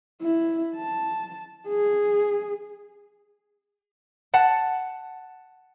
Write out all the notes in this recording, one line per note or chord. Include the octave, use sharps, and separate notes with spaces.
E4
A5
G#4
F#5 A5 C#7